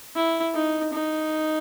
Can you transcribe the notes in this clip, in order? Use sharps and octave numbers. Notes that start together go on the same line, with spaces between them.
E4
D#4
D#4